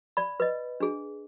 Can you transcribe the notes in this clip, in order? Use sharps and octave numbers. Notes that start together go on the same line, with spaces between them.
D5 B5
B4 D#5
D4 G#4